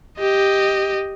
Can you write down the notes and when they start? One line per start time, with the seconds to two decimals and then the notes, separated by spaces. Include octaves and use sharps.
0.19 G4 D#5